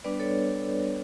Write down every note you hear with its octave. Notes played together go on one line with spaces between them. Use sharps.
G3 B3 D4 B4 D5
A4 C#5